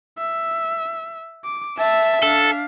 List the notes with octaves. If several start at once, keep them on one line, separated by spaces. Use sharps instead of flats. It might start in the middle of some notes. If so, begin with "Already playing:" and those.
E5
D6
E5 A5 E6
D4 A4 F5